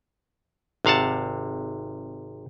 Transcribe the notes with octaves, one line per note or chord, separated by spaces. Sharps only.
G#1 C3 F5 F#5 A5